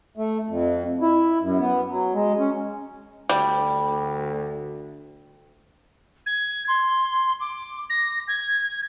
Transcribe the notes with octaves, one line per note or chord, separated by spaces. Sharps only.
A3
F2
E4
F#2
B3
F#3
G#3
C#4
D2 G3
G#6
C6
D6
A#6
G#6